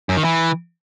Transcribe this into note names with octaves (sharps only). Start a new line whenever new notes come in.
F#2
D#3
E3